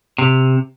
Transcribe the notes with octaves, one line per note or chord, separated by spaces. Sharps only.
C3